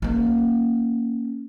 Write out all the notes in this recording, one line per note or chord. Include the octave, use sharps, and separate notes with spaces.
A#3 C#4